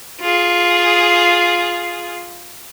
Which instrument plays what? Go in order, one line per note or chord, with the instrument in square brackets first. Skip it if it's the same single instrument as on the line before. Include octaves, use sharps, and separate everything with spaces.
[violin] F4 G#4